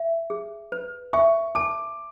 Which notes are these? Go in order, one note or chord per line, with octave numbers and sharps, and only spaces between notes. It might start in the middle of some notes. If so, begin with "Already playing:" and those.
Already playing: E5
G#4
B4
E5 C#6
A5 D6